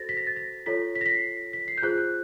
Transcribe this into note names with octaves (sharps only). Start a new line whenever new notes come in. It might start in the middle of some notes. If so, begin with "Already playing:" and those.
Already playing: F#4 A4 C5 A6 A#6
B6
A#6
A6
A#6
F4 A4 C#5 B6
B6
A#6
B6
C7
B6
C7
G6
F4 G#4 C5 F#6
F#6